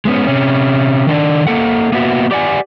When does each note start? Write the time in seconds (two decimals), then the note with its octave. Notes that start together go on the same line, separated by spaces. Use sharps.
0.05 G#3 B3 C#4
0.27 C3 C#4
1.07 D#3 D4 D5
1.47 A#3 A4 F#5
1.92 A#3 B3 F#4 E5
2.31 G4 D5 F#5 G#5